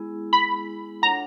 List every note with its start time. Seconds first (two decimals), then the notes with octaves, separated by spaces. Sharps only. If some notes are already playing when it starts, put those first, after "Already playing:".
Already playing: G#3 B3 E4 G#4
0.33 B5
1.02 D4 F4 A4 C#5 F#5 A#5